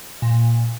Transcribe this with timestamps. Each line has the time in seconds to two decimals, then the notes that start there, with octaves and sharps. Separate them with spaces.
0.22 A#2